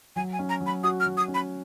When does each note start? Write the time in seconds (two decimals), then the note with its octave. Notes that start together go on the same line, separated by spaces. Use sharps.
0.16 F#3 G#5
0.33 G#5
0.39 C#4
0.49 A#5
0.61 F#3
0.66 B5
0.84 F#4 D#6
1.00 F6
1.06 F#3
1.17 D#6
1.28 C#4
1.34 B5